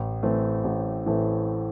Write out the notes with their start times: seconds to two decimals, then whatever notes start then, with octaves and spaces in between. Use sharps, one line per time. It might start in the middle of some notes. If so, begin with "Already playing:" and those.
Already playing: A1
0.23 A2 E3 A3 C4
0.64 A1
1.06 A2 E3 A3 C4